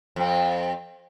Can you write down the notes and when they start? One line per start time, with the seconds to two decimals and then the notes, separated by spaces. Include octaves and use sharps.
0.16 F2 C4